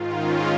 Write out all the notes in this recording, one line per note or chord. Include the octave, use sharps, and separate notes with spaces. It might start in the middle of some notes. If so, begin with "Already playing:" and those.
Already playing: G#2 D#3 F4
C#4